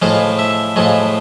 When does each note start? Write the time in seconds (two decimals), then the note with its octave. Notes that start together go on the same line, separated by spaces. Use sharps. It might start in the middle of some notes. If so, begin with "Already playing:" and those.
0.02 A2 F3 G#3 F5
0.39 E5
0.76 A2 F3 G#3